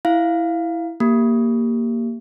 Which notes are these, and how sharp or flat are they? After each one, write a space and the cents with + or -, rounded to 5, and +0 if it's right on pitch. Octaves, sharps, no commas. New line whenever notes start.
E4 +0 F5 +0
A#3 +0 G4 +0